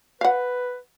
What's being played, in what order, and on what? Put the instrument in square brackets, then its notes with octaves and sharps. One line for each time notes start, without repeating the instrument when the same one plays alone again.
[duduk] B4 [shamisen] F5 F#5